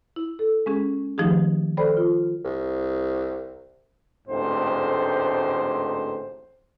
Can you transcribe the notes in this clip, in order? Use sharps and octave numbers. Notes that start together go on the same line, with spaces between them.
E4
A4
G#3 C#4 G#4
D#3 F3 A3 D#4 G4 G#4
A4 C5 D5 G5 B5
F4
C2
A1 D2 G#2 C4 C5